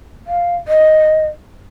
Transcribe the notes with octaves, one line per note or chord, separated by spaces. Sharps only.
F5
D#5